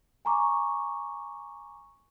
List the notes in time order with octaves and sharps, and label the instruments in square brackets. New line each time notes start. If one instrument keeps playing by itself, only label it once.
[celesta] G#5 A#5 C#6 D6